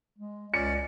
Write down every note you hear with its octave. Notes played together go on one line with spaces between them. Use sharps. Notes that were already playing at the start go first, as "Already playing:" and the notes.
G#3
C#2 C#4 D5 C#7